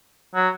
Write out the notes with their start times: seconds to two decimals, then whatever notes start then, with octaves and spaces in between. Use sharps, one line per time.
0.35 F#3